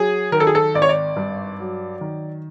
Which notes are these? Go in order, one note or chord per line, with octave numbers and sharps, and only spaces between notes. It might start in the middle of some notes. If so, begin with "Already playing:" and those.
Already playing: F#3 G#4
D#3 A#4
A4
G#4
A4
G#1 D5
C#5
D5
G2
F#3
D#3